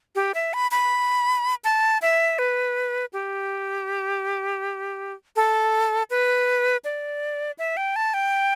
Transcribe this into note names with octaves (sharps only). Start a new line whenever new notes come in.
G4
E5
B5
B5
A5
E5
B4
G4
A4
B4
D5
E5
G5
A5
G5